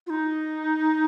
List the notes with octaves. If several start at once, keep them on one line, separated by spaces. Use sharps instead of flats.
F4
D#4